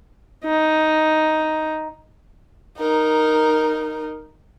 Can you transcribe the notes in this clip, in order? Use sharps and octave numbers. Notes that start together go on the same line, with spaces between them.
D#4
D#4 A#4